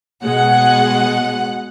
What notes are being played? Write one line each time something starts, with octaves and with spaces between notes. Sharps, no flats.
B2 G#3 F#5